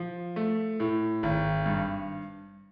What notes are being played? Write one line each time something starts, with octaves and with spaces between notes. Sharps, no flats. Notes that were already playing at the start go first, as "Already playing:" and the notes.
Already playing: F3
A3
A2
G#1
G2